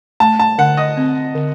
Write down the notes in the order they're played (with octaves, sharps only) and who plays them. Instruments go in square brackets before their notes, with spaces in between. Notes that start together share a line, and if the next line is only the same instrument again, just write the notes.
[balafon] A3 [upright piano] A5
[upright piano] A5
[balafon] D3 [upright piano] F#5
[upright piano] D#5
[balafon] C4
D3